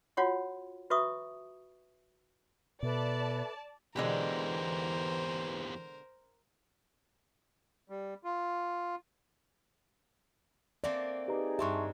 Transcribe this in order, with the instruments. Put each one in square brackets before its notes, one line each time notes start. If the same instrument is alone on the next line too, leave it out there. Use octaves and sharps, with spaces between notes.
[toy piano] F4 F#4 C#5 F#5 C6
F#4 B4 E5 B5 C#6 D#6
[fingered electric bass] B2 [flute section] A4 B4 E5 [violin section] D5 A5
[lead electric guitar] E2 G4 [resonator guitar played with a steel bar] B2 D3 G#3 [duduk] E3 [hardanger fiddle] A#4 C5
[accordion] G3
F4
[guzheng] A3 A#3 C4 [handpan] D5
[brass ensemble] D#4 G#4 [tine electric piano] G4 B4 A#5
[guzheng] G2 C4 A5 [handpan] G4 [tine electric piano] E5 C6 C#6